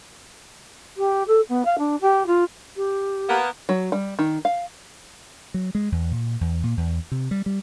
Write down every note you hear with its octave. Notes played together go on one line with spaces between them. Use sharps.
G4
A4
B3
F5
D4
G4
F4
G4
A#3 B3
F#3
G3
D#3
F5
F#3
G#3
E2
A#2
E2
A#2
E2
C3
G3
G3